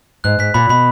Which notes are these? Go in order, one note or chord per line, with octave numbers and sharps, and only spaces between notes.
G#2 F#6
G#2 B6
A#2 B5
B2 B5